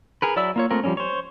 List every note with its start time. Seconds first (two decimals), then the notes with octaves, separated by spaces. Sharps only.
0.22 G#4 A#4 B4
0.36 F#3 E4 D5 E5 E6
0.56 A#3 F4 C#5
0.71 A3 A#3 C4 F4 A#4
0.84 F3 G3 A#3 C4 C#4
0.97 C5 C#5